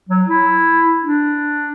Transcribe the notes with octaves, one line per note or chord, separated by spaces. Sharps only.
F#3
E4
D4